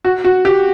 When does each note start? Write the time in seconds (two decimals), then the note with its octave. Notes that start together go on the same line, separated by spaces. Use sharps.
0.05 F#4
0.24 F#4
0.45 G4